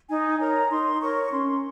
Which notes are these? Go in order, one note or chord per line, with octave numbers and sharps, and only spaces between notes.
D#4 G#5
A#4 C#5 A#5
D#4 C6
A#4 C#5 C#6
C#4 C6